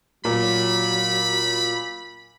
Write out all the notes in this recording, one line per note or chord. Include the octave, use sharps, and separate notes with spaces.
A#2 F#3 B5